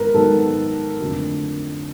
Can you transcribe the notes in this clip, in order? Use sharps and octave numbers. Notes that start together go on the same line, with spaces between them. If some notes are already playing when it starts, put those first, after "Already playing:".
Already playing: G#2 D#3 B3 A#4 B4
G#2 D#3 F#3 B3 A4
F2 D3 F#3 A3